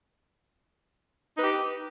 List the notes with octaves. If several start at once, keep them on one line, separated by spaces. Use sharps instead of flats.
D#4 G4 B4